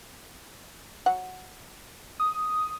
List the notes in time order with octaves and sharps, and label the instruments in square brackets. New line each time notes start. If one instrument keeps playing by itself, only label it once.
[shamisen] F#3 F#5
[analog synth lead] D#6